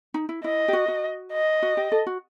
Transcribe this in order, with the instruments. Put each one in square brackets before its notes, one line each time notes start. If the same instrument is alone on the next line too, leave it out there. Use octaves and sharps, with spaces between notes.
[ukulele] D#4
E4
[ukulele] E4 [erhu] D#5
[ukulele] G4
F#4
F#4
[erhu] D#5
[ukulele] F#4
G4
A4
F#4